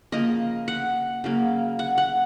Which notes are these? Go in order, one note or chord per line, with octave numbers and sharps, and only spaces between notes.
C#3 F3 A#3 D#5
F#5
C#3 F#3 A#3
F#5
F#5